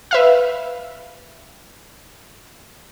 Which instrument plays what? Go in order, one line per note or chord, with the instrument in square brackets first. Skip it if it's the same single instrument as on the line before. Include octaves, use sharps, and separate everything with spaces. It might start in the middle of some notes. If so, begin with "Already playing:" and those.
[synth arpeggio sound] B4 E5 F5